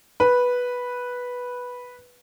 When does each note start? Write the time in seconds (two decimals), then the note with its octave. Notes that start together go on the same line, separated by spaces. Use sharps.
0.20 B4